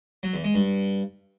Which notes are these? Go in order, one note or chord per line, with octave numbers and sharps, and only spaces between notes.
F#3
E2
G#3
G2